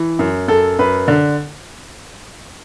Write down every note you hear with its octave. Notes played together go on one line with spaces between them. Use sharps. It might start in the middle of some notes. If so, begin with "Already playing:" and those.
Already playing: E3
F#2
F#2 A4
F#2 B4
D3